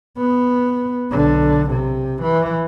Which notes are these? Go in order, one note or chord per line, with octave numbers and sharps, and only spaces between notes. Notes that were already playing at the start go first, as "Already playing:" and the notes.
B3
B1 D3
C3
E3